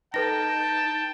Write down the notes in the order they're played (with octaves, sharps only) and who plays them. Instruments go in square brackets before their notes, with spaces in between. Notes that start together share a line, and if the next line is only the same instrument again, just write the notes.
[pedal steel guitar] D#4 [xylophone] A4 B4 A#6 [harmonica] G5 [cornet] A5